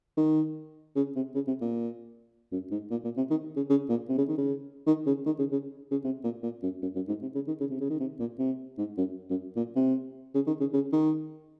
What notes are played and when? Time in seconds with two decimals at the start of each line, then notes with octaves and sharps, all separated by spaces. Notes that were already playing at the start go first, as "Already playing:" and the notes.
0.17 D#3
0.96 C#3
1.15 C3
1.35 C#3
1.47 C3
1.61 A#2
2.52 F#2
2.71 G#2
2.91 A#2
3.04 A#2
3.17 C3
3.30 D#3
3.56 C#3
3.70 C#3
3.89 A#2
4.09 C3
4.18 C#3
4.28 D#3
4.38 C#3
4.87 D#3
5.06 C#3
5.26 D#3
5.39 C#3
5.52 C#3
5.91 C#3
6.04 C3
6.24 A#2
6.43 A#2
6.63 F#2
6.82 F#2
6.95 F#2
7.08 G#2
7.22 C3
7.35 C#3
7.47 D#3
7.60 C#3
7.70 C3
7.80 C#3
7.90 D#3
8.00 C3
8.19 A#2
8.39 C3
8.78 G#2
8.97 F#2
9.30 F#2
9.56 A#2
9.76 C3
10.34 C#3
10.47 D#3
10.60 C#3
10.73 C#3
10.93 D#3